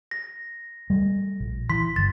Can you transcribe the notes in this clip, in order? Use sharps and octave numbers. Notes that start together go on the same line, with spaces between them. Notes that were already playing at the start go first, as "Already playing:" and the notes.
A#6
G3 A3
A#1
E3 C6 B6
G1 A6